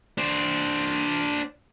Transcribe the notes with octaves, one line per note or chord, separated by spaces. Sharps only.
D4 C5